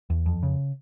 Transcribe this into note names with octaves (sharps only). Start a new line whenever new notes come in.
E2
F2
C#3